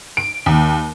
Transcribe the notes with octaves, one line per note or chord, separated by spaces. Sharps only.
D7
D#2